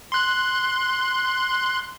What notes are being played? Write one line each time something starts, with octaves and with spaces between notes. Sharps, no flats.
C6 F#6